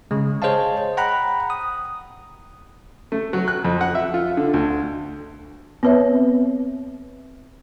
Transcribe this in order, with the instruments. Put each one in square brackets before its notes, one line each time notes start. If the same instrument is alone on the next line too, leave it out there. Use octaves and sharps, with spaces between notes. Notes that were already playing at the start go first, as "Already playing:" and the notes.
[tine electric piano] C#3 G#3
G#4 C5 C#5 D#5 F5 A5
F#5 G5 A#5 B5 F#6
D#6
[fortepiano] A3
F#3
F#6
F2
F#5
E5
F4
D3
D2
[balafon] B3 C4 B4 C#5 E5